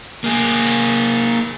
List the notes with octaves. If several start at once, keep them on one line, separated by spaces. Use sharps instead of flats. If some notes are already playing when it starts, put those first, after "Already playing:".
A#3 G#4